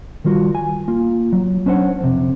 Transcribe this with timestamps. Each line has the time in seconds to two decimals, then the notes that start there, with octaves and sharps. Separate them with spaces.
0.25 D#3 G3 F4 F#4
0.55 G#5
0.88 A#3 F4
1.33 F#3
1.66 C#4 D4 C5 C#5 F#5
2.01 F2 C3